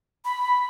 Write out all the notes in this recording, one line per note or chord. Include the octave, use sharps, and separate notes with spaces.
B5